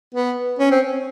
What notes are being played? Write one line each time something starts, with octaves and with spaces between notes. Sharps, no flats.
B3
C#4
C4